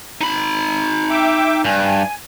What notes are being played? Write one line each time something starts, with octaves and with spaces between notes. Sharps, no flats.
D#4 B5
E5 G5 D6
G2 G#5